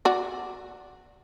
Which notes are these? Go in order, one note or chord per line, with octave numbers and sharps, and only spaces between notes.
F#4 D5